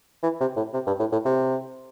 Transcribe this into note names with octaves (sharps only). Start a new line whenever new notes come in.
E3
C3
A2
C3
G2
A2
A2
C3